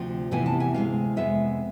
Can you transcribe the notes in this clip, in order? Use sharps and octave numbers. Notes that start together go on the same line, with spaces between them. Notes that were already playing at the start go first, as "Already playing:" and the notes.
Already playing: D2 C3 F3
E2 C3 E3 B3 G#5
A5
G#5
D2 C3 G#3 F5
F2 C3 G#3 B3 E5